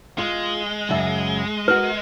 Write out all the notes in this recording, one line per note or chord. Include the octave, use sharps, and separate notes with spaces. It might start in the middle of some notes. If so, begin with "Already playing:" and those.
G#3 F4
F#2 C#3 E5
F#4 A#4 B4